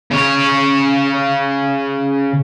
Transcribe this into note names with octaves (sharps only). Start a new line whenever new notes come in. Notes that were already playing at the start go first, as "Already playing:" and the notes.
C#3 C#5